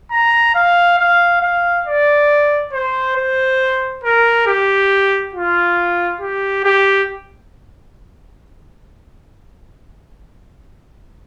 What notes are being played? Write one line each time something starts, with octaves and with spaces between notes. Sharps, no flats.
A#5
F5
F5
F5
D5
C5
C5
A#4
G4
F4
G4
G4